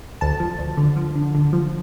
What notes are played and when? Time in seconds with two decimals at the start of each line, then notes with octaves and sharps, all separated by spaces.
0.21 D2 A5
0.40 F3
0.59 D2
0.77 D3
0.96 F3
1.15 D3
1.34 D3
1.53 F3